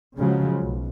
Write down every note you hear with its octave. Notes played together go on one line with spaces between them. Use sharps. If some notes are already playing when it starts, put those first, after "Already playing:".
C#3 F3 F#3 G#3
B1